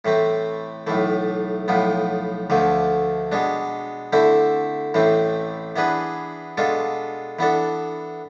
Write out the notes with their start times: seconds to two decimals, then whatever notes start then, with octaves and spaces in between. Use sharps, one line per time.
0.05 A2 E3 A3 C4
0.87 B1 A2 E3 A3
1.68 B1 A2 F3 B3
2.50 D2 D3 F3 A3
3.32 B2 G#3 D4
4.13 D3 A3 C4 E4
4.94 A1 A2 E3 A3 C4
5.76 E3 B3 D4 G#4 B4
6.57 B2 G#3 D4 F4 A4
7.39 E3 B3 D4 A4